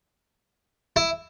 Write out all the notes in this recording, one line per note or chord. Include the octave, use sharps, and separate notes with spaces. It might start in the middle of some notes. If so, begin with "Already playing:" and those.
E4